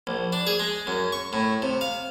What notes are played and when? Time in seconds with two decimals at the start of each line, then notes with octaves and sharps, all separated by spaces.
0.07 A#1
0.33 D4
0.47 G#4
0.60 G#3
0.87 F#2
1.12 C#6
1.33 A2
1.62 C3
1.81 F5